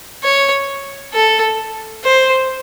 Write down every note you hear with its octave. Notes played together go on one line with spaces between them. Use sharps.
C#5
A4
C5